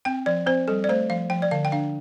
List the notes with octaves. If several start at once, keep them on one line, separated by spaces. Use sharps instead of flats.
C4 G5
F3 D5
C4 C5
G3 A4
D5
A3 C5
F3 F5
F3 G5
D5
D3 F5
G5
D4 F5